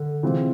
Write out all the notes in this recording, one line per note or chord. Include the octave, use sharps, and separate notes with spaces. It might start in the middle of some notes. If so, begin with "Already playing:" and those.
Already playing: D3
C3 E3 G#3 C4 F4